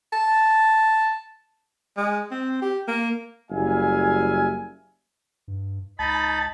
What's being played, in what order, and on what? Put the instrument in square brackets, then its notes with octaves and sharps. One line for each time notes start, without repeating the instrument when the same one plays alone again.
[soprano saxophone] A5
[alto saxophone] G#3
C4
G4
A#3
[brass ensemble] F#1 G3 E5 F5 G#5
[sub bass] G2
[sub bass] C#2 [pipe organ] D#4 B5 [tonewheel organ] A5